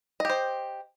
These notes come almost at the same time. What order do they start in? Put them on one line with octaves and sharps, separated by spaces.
D#5 G4 C5